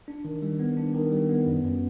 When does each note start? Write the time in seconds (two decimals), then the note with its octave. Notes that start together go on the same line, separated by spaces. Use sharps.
0.08 D4
0.25 D#3
0.42 G3
0.59 B3
0.77 D4
0.95 D#3
1.12 G3
1.29 B3
1.47 F#2
1.64 F#2